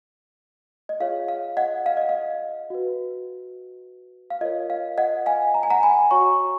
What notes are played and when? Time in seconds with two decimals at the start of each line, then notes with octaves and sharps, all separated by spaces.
0.89 D#5
1.00 F4 G#4 C#5 F5
1.28 F5
1.57 D#5 F#5
1.86 F5
1.97 D#5
2.09 F5
2.70 F#4 B4
4.30 F5
4.41 F4 A#4 C#5 D#5
4.70 F5
4.98 D#5 F#5
5.26 F5 G#5
5.54 A#5
5.63 G#5
5.70 F#5 A#5
5.83 G#5 B5
6.11 F#4 C#5 A#5 C#6